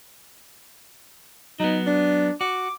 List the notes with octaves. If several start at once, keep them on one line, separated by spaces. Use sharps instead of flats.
F#3 B3 D#4
D4
F#4 D6